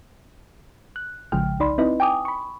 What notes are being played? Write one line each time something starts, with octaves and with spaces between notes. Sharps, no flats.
F#6
A1 C#3 F3 G#3 G5 F6
C2 D#4 D5 B5 C6
C4 D#4 E4 B4 D#5
G5 G#5 D6 D#6
B5 C#6